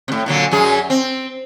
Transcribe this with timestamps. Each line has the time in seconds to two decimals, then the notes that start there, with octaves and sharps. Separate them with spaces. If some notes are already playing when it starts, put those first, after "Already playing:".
0.08 A2 C3
0.26 A#2 D3 F#3
0.51 F#2 F#3 G#4
0.90 C4